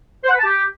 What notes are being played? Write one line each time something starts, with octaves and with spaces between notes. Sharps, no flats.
C5
F#5
B4
A5
G4